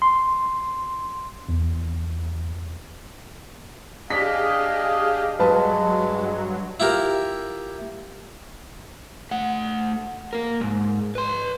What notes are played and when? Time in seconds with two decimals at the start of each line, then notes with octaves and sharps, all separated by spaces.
0.02 C6
1.49 E2
4.10 D4 G4 G#4 D#5 F5 B6
5.39 G2 F#3 G#3 B4 A5
6.80 E4 F4 G4 A#4
9.31 A3 F#5
10.33 A#3 A#4
10.60 B1 G#2
11.15 B4 C6